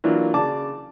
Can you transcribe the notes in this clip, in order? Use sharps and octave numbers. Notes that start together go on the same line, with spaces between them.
E3 F#3 A#3 D4 F4
C#3 D5 A5 D6